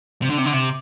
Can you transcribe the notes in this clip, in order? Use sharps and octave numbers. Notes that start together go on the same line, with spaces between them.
C3
D3
C3
D3
C3